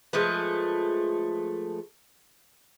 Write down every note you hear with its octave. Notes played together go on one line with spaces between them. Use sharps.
F3 G#3 A3 B4